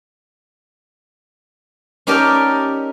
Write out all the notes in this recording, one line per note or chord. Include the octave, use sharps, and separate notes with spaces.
C#4 D#4 G4 A#4 D5 A5